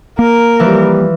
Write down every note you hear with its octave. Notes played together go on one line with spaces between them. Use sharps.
A#3 A#4
E3 F3 G3 F4